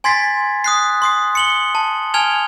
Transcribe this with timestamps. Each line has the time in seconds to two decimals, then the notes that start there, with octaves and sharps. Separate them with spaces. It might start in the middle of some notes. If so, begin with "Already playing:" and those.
0.04 G#5 C6 G#6 A6 B6 C7
0.64 D#6 F#6 C7
1.02 C6 D#6 C7
1.35 C#7 F#7 G7
1.75 A5
2.14 G#5 A5 F6 G#6 F7 G7